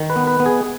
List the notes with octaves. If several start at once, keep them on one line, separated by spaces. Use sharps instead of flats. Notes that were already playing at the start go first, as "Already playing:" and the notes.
Already playing: D#3
B4
B3
B4
B3
G#4